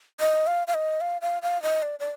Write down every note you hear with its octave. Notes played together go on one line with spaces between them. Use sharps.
D#5
F5
F5
D#5
F5
F5
F5
D#5
D5
D5